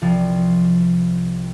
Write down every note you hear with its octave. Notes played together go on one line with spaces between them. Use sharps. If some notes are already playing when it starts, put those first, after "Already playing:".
C2 F3